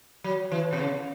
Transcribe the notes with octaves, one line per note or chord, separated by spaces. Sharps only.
F#3
E3
B2
C#3